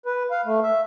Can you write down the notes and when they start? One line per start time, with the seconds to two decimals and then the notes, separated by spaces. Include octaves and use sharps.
0.06 B4
0.31 F5
0.45 A3
0.63 E5